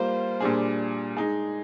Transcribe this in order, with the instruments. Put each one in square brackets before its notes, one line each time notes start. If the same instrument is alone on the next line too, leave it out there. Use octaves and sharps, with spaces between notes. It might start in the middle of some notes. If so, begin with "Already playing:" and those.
Already playing: [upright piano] G3 A#3 F4 [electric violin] C5
[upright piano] A#2 G3 D4 G#4
G#3 D#4 G#4